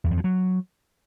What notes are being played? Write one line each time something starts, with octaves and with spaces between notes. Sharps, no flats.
E2
F2
F3
F#3